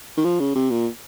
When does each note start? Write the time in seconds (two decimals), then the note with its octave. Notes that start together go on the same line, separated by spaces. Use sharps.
0.17 D#3
0.25 F3
0.40 C#3
0.56 C3
0.71 A#2